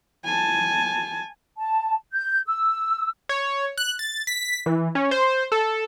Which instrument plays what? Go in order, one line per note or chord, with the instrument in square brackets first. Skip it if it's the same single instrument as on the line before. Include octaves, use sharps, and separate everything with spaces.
[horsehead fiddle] G#5 A5
[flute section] A5
G6
E6
[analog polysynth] C#5
F#6
A6
B6
E3
C#4
C5
A4